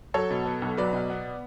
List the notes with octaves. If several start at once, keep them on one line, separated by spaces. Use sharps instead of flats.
F#3 A4 C#5
B2
B3
B1
F#3 B4 D5
B2
B3